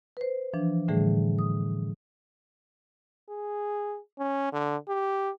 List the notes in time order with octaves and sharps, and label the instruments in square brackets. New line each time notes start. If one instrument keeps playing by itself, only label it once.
[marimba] B4 C5
E3 F3 D4
A2 D3 E3 G3 A3 G#4
D#6
[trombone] G#4
C#4
D3
G4